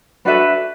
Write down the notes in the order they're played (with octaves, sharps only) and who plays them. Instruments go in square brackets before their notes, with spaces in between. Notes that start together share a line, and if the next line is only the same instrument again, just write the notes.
[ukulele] D4 F#4 A4 E5 [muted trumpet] B4